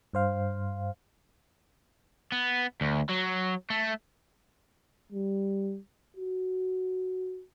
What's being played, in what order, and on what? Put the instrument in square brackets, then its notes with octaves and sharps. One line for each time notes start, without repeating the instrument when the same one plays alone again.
[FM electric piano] G2 C5 F5
[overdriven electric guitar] B3
D2
F#3
A3
[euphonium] G3
F#4